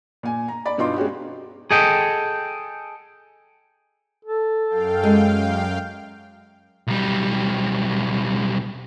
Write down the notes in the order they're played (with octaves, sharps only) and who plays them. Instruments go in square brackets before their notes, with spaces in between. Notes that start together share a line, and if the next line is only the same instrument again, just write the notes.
[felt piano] A#2 G#5
A#5
D5 B5
G2 B2 D#4 F4 C6 D6
G#3 C#4 F#4 G4
[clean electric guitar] G#4 A4 D#5 G5
[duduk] A4
[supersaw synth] F#2 F5 G5
[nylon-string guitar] G#3
[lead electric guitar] B1 G3